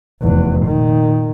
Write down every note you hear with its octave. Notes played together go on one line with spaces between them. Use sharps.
F1 E2
A#2 D#3